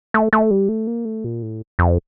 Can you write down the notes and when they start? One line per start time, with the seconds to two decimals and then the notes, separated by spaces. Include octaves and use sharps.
0.14 A3
0.33 A3
0.51 G3
0.69 A3
0.87 A#3
1.05 A3
1.24 A#2
1.43 A2
1.79 F2